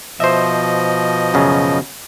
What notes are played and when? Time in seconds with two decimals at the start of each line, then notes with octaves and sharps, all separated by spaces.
0.20 B2 F3 C5 D#5 E5
1.34 F#2 C#3